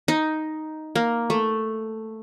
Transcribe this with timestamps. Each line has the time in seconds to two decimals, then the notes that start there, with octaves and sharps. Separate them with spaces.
0.08 D#4
0.95 A#3
1.30 A3